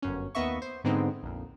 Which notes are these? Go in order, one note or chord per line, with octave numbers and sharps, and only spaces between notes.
G1 F#2 C#4
D#2 A#3 B3 D#5 E5 C#6
C5
G#2 D3 G#3 B3 C4 D#4
A#1 F2